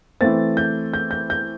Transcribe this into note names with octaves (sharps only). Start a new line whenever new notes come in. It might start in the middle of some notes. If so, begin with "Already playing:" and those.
E3 A3 C4 A6
G6
G6
G6
G6